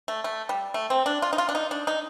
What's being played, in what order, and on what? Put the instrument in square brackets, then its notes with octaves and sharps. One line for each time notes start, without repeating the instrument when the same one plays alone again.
[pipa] A3
A3
G3
A3
C4
D4
F4
D#4
F4
D4
D#4
D4
D#4